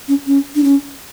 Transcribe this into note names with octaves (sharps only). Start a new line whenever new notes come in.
C#4
C#4
D4
C#4